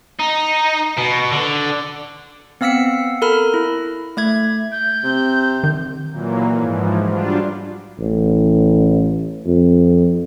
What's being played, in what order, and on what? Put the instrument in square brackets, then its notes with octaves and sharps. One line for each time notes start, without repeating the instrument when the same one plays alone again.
[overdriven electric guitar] D#4
B2
D3
[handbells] B3 C4 F5 E6 B6 C#7
A4 A#4 B5 F6
E4
A3 E5 G#6
[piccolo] G6
[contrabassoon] C3
[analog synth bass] D#3
[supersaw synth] A#2 E3 F#3 A#3
G#2 E3 F3
F#3 G3 D4 F4
[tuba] A1
F2